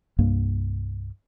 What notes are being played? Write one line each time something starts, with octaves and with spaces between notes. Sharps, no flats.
C2 G2 A#3